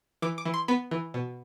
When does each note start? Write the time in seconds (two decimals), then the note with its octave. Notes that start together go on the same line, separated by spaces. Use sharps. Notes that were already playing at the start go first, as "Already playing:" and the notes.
0.22 E3 D6
0.38 D6
0.45 E3
0.54 C6
0.68 B3 B5
0.91 E3
1.14 B2